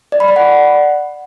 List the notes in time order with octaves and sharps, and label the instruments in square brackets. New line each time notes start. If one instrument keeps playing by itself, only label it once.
[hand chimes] D5
B5
D5
F#5